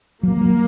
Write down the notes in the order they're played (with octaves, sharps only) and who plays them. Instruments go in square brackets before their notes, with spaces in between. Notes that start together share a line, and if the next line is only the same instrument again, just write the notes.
[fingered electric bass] F#3 [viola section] A#3
[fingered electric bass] F#3